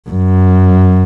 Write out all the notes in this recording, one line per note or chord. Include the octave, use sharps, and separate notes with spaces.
F#2